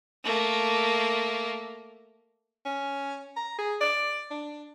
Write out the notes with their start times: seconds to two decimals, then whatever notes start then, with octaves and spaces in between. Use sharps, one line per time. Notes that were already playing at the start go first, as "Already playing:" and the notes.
0.24 A3 A#3
2.65 C#4
3.36 A#5
3.59 G#4
3.81 D5
4.31 D4